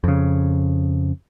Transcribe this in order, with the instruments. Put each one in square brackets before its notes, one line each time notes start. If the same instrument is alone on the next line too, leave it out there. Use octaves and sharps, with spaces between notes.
[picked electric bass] F2 C#3